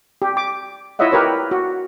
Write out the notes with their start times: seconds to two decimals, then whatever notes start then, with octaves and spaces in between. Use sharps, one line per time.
0.22 G4
0.37 D6
0.99 E4 F4 C#5 D#5 E5 F#5
1.12 G4 A#4 B4 C#5
1.51 F#4